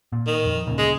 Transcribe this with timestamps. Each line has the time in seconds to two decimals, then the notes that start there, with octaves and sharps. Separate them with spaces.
0.12 A#2
0.27 D#3
0.46 F2
0.67 D2 A#2 C#3
0.78 G#3